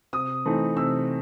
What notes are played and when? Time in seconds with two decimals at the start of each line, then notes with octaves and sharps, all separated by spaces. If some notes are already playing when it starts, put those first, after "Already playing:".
0.13 C3 D#6
0.45 E3 A3 C4 D#4
0.77 C3 E6